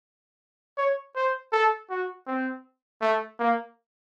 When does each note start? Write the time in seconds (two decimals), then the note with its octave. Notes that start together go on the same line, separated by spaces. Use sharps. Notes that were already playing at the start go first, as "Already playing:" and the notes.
0.78 C#5
1.16 C5
1.53 A4
1.90 F#4
2.27 C4
3.01 A3
3.40 A#3